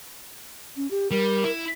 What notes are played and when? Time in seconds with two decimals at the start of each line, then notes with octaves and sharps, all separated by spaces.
0.77 C#4
0.91 G4
1.11 G3 A#4
1.44 E4